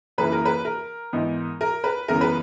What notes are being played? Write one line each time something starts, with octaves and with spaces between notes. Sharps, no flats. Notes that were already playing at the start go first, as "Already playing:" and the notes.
F#2 C#3 E3 A#3 E4 B4
A#4
B4
A#4
G#2 E3 B3 D#4
A#4
B4
F#2 C#3 E3 G#3 B3 A#4
B4